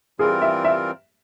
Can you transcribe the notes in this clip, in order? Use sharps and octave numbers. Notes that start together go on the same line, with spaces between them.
E3 G3 C4 F4 G#4 A#4
E5
E5